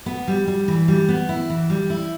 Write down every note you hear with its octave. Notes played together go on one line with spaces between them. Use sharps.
B3
G3
G3
E3
G3
B3
E4
E3
G3
E4